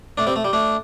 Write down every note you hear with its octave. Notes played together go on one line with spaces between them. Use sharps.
A3 D4
G3 C4
A3
G3
A3 D4